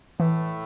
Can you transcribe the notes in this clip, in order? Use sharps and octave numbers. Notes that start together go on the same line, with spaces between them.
A2 E3 A3